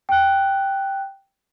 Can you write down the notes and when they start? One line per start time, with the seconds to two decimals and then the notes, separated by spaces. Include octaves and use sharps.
0.09 G5 F#6